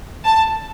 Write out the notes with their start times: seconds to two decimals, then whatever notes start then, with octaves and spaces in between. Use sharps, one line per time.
0.25 A5